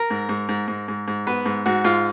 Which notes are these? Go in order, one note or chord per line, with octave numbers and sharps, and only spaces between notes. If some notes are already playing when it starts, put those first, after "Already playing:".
Already playing: A#4
G#2
G#2
G#2
G#2
G#2
G#2
B3 B4
G#2
G#2 F#4
G#2 F4